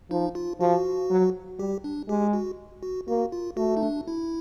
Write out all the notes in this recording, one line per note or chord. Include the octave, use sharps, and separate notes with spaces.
F3 D#4
F4
F3 F#4
F#3
G3 G4
D4
G#3 G4
F#4
F#4
A#3 F#4
F4
A3 F#4
D#4
D4
E4